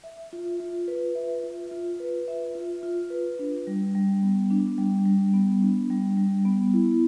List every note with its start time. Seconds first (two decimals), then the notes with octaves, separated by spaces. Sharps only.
0.04 E5
0.33 F4
0.60 F4
0.88 B4
1.15 E5
1.44 F4
1.71 F4
2.00 B4
2.28 E5
2.55 F4
2.83 F4
3.10 B4
3.39 D4
3.67 G3
3.95 G3
4.23 B3
4.51 D4
4.78 G3
5.05 G3
5.34 B3
5.62 D4
5.90 G3
6.17 G3
6.45 B3
6.74 E4